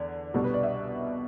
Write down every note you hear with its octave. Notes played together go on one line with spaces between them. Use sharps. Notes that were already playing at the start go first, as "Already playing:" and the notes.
Already playing: E2 D3 D4
C2 B2 G3 D4 A4
B4
D5
E5